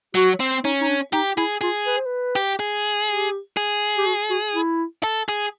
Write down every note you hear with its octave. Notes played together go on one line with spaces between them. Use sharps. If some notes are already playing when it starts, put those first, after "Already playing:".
F#3 F#4
C4
C#4 D#4
D#4
D4
D#4 G4
E4 G#4
F4 G#4
B4
C5
B4
G4
G#4
G4
G#4
G4
F#4
F#4
E4
A4
G#4